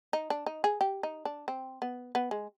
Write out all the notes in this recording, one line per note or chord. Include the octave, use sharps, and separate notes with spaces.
D#4
D4
D#4
G#4
G4
D#4
D4
C4
B3
B3
G#3